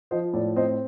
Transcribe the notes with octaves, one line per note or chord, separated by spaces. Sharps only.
F3 C5 D#5
A2 D5
C4 C5 D#5